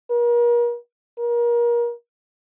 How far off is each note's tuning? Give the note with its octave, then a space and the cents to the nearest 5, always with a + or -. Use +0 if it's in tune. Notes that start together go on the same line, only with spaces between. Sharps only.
A#4 +40
A#4 +30